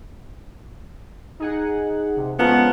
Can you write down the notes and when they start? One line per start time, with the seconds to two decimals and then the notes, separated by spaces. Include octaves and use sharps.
1.39 D#4 G#4 F#5
2.17 C3
2.39 F3 G#3 B3 C#4 A#4